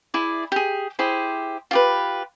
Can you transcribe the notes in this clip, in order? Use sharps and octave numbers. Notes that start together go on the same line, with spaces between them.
E4 G#4 D5
G4 G#4
E4 G4 G#4 C5
F4 G4 B4